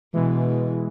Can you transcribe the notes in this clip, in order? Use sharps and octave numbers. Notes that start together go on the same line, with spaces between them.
B2 E3 G#3